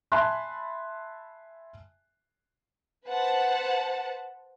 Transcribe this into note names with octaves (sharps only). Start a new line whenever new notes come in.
E5 G#5 A5 B5 C6 F#6
B4 C5 F#5 A5